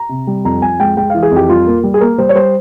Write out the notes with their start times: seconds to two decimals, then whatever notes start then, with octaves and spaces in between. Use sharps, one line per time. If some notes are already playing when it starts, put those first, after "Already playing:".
Already playing: A#5
0.09 C3
0.27 G3
0.45 F2 A#5
0.62 F2 G#5
0.80 G#3 G5
0.97 G#3 G5
1.10 E3 F5
1.23 G#4
1.31 F2 G4
1.49 G3 F4
1.67 A#3
1.83 G3
1.94 G#4
2.01 A#3 A#4
2.18 G3 C5
2.29 C#5
2.35 G3 C5